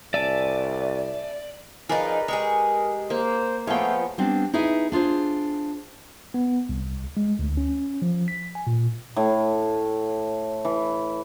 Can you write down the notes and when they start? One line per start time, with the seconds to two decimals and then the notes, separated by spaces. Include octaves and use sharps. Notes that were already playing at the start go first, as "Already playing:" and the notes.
0.14 C2 D5 E5 G#5 A5
1.89 F3 D#4 G#4 A#4 B4 D5
2.28 G#3 G4 G#4 A#4 C#6
3.10 A#3 C5
3.67 F3 A3 B3 F4 G#4 C#5 G5
4.18 G3 B3 C4 D4
4.54 D#4 E4 G#4 B4 E5
4.92 D4 F4 G#4 C5
6.34 B3
6.69 C2
7.17 G#3
7.39 D2
7.57 C#4
8.02 F3
8.28 B6
8.55 G#5
8.67 A#2
9.16 A2
10.65 E3